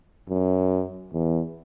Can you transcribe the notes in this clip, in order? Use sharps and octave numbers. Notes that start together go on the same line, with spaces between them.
F#2
E2